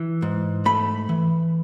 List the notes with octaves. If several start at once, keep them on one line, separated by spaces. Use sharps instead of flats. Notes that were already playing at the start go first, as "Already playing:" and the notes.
Already playing: E3
G#2
A3 B5
E3